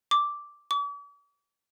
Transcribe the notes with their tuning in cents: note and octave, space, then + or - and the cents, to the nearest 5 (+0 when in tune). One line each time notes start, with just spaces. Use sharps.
D6 -5
D6 -45